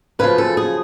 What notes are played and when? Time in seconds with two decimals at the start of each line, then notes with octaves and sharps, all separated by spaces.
0.19 F#2 C#3 F3 B4
0.38 A4
0.57 G#4